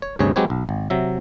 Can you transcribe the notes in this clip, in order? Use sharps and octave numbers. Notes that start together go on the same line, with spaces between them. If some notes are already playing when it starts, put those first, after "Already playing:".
C#5
D2 G2 C3 C#4 G#4 C#5
F#3 G#3 C4 G4 B4 C#5
B1
G#1
C3 F#3 E5